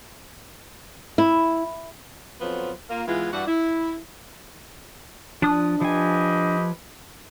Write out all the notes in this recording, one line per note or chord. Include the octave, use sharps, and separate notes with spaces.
E4
F2 F3 F#3 B3 F4 C5
A#3 F4 A#4
E3 G#3 B3 E4 F4
G2 E3 D4 F#4 F#5
E4
F3 D4 D#6 F#6
F3 G4 B4 D#5 G#5